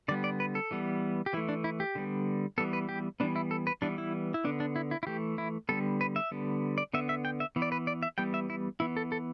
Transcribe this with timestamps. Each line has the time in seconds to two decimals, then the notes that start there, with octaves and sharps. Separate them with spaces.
0.08 D3 G3 B3 D5
0.24 D5
0.40 B4
0.55 A4
0.71 E3 G3 B3
1.26 G4
1.33 E3 E4
1.37 A3
1.49 D4
1.64 E4
1.80 G4
1.95 D3 G3 B3
2.58 E3 G3 B3 A4
2.73 B4
2.89 G4
3.20 E3 G3 B3 D4
3.36 E4
3.51 A4
3.67 B4
3.82 E3 G3 B3 D4
3.98 E4
4.34 E4
4.44 D3 B3 D4
4.60 D4
4.76 E4
4.91 E4
5.03 E4
5.07 E3 A3 G4
5.38 E4
5.69 D3 G3 B3 A4
6.01 B4
6.16 E5
6.31 D3 G3 B3
6.78 D5
6.94 D3 B3 E5
7.09 E5
7.25 G5
7.40 E5
7.56 E3 B3
7.62 D5
7.72 B4
7.87 D5
8.03 E5
8.18 E3 G3 B3 G5
8.34 E5
8.50 E4
8.80 E3 B3 E4
8.97 A4
9.12 A4